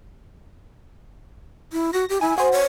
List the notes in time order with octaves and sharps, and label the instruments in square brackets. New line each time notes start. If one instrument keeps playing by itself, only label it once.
[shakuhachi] E4
[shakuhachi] F#4 [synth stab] A#6
[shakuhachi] G4
[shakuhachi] E4 [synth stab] G#5
[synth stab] F#4 C5 [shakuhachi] G#5
[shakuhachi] C#5